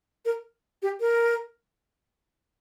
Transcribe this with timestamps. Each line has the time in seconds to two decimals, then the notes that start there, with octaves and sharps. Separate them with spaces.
0.25 A#4
0.82 G4
1.00 A#4